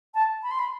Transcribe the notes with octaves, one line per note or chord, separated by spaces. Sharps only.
A5
B5
C6
B5